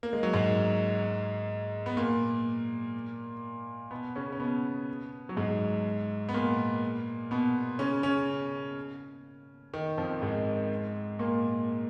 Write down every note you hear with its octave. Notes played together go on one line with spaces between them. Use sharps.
A#3
G#3
F#3
G#2 G#3
B3
A#2 A#3
B2 B3
C#3 C#4
C#4
B2 B3
F#3
G#2 G#3
B3
A#2 A#3
B2 B3
C#3 C#4
C#3 C#4
D#3
F2 F3
G#2 G#3
A#2 A#3